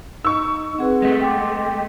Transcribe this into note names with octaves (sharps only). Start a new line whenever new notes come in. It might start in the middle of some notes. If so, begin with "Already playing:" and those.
D#4 C#6 E6
C4 G#4 B4 F#5
G#3 A3
G5 C6 D6